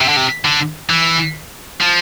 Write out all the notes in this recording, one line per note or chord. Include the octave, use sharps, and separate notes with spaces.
C3
D3
C3
D3
E3
F3